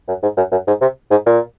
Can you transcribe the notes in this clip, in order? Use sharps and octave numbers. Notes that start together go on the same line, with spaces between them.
F#2
G#2
F#2
F#2
G#2
C3
G#2
A#2